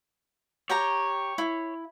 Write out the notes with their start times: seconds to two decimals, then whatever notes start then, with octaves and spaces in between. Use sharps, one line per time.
0.70 G4 C#5 G5 A#5
1.38 E4